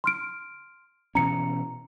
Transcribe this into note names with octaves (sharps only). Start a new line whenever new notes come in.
C6 F6 D7
B2 E3 C#4 A#5 C#7